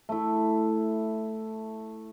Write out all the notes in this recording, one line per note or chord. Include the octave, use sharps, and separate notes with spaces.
A3 E4